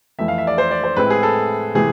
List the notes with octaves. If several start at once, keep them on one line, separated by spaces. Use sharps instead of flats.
F2 E3 A3 E5
F5
E5
D5
C5
D5
C5
A2 G#3 C4 E4 B4
G#4
A4
C3 E3 A3 G#4